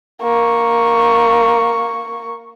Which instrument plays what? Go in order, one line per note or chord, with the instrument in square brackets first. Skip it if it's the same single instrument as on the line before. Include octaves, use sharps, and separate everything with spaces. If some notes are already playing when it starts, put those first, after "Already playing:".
[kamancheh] A#3 C#6